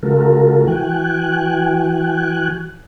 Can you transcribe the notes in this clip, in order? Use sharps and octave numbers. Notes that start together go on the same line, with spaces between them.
C#3 G#3 F4 F#4 A4 A#4
E3 F#4 G5 G#5 F#6